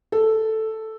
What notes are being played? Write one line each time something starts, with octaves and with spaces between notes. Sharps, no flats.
A4